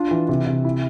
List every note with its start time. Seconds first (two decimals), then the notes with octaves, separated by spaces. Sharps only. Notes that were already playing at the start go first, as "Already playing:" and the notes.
Already playing: D4 F4
0.11 E3
0.29 C3
0.47 C3
0.65 E4